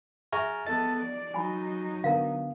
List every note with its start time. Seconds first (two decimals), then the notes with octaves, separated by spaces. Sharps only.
0.33 G#4 E5 G#5 A#5 C#6 F6
0.67 B3 A4 D#5 A6
1.01 D5
1.34 F#3 D#4 G#5 B5
2.04 D3 B3 A#4 F5